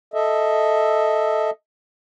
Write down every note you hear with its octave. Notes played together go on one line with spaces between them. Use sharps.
A4 D#5 E5